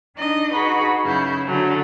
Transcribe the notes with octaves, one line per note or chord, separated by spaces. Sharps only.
D4 D#4 D#5
D#4 F#4 G#4 B4 B5
F#2 C#3 E4 G6
D3 F#3 A3 C#4